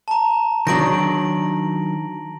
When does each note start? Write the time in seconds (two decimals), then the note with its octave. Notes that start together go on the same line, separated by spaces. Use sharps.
0.08 A5 A#5
0.67 D#3 F#3 D4 A#6 D7 F#7